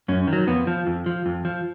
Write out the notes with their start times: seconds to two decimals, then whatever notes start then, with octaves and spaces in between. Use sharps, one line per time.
0.08 F#2 C#4
0.27 D#3
0.33 F#3
0.48 F2 B3
0.67 F3
0.87 F2
1.06 F3
1.26 F2
1.45 F3